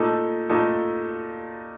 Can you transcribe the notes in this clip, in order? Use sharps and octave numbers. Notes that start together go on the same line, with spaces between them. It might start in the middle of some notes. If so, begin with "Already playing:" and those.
Already playing: A#2 A3 D#4 A4
A#2 A3 D#4 A4